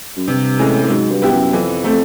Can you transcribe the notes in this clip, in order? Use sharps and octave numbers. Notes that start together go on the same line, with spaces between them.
F#2
G2 C3
A2 E3 G#3 C#4
A2
G#2 F#3
G2
B3 E4 G4
F#2
F2 E3
A3 C4